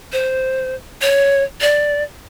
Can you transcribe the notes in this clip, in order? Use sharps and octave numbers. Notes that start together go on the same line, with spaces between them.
C5
C#5
D5